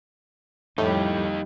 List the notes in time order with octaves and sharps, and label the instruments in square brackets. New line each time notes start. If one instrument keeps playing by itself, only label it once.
[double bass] F2 G3 [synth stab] A2 [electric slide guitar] D#4 G4